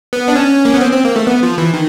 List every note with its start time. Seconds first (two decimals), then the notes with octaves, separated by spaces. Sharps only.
0.13 B3
0.28 D4
0.35 C#4
0.65 A#3
0.74 B3
0.81 C4
0.93 C4
1.05 A#3
1.16 A3
1.27 B3
1.43 F3
1.58 E3
1.74 D#3